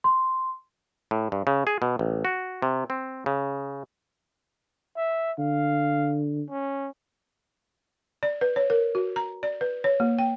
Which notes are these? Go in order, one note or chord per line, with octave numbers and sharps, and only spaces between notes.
C6
A2
G2
C#3
G#4
B2
A1
F#4
C3
C4
C#3
E5
D3 F5
C#4
D5
B4
C#5
A#4
F#4
A#5
D5
B4
C#5
A#3
G5